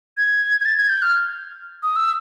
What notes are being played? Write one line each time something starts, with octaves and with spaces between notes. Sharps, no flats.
G#6
G#6
A6
G#6
G6
F6
D#6
E6